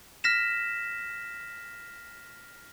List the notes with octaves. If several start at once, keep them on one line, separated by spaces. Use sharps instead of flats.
F6 A#6 B6 E7